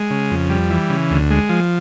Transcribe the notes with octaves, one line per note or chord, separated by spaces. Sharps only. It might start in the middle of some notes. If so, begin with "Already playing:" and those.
Already playing: G#3
C#3
F2
G3
E3
C#3
D2
G#3
F3